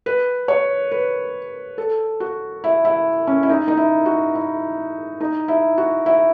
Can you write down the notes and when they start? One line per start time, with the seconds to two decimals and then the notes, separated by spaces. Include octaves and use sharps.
0.06 B4
0.48 C#5
0.92 B4
1.78 A4
2.20 F#4
2.64 E4
2.85 E4
3.27 C#4
3.43 E4
3.49 D#4
3.68 D#4
3.77 E4
4.06 F#4
4.35 E4
5.20 D#4
5.48 E4
5.78 F#4
6.06 E4